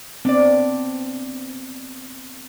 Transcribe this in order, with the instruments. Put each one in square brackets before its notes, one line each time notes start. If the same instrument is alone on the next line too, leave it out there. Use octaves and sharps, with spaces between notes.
[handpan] B3 C4 [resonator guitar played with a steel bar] D4 D5